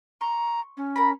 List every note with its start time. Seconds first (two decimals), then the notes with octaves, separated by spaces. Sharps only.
0.21 A#5 C6 C#6
0.77 C#4
0.96 A#4 A#5 B5